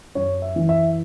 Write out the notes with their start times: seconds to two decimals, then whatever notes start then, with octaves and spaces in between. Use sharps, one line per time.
0.15 F#2 C#5
0.42 E5
0.56 E3
0.69 E5